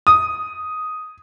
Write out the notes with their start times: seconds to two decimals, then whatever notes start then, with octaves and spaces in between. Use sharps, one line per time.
0.07 D#6